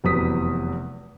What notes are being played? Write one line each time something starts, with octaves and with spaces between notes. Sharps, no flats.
F1 E2 F#3 B3 D#6 B6